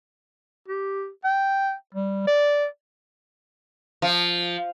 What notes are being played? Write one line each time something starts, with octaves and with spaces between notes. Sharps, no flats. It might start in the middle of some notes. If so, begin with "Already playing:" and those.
G4
G5
G3
D5
F3